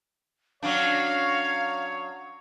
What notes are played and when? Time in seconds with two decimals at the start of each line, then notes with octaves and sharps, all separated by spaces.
0.63 F#3 C#4 D4 C#5 F5